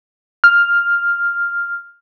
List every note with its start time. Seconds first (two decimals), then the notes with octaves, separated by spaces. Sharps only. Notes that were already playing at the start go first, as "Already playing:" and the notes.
0.44 F6